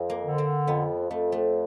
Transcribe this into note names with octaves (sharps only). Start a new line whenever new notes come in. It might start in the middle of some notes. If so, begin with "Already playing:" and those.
Already playing: F2
A#3
D3
C4
F2 B3
F2 A3
A3